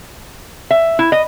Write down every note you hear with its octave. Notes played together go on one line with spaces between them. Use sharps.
E5
E4
D#5